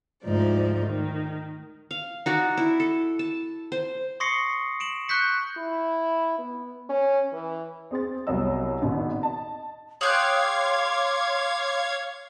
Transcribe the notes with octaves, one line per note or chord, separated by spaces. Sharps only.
D2 G#2 F3 D#4 D5
D#3
F5
D#4 F#4 D5
E4
A4
A5
C5
C6 C#6 D#6 A#6 C7 C#7
D7 E7 F#7
C#6 F#6 G6 B6 C#7
E4
B3
C#4
E3
C4 G#4 C6 A6
C2 F#3 B3 C#5 D#5 E6
G#1 B2 D#3
D#5 A5
G#4 C#5 F5 G5 C6 D6 F#6 G#6